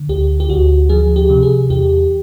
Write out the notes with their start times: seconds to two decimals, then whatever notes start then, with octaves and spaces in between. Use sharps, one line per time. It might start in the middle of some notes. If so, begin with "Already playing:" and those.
Already playing: D3
0.09 D2 G4
0.40 G4
0.50 D2 F#4
0.89 F3 G#4
1.16 G4
1.30 C3
1.43 G#4
1.70 E2 G4